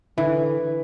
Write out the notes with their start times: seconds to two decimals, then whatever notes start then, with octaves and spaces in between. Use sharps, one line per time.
0.18 D3 E3